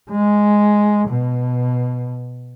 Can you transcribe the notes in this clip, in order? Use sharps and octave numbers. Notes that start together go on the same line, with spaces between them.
G#3
B2